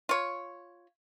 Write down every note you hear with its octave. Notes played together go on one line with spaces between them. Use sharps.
F4 C#5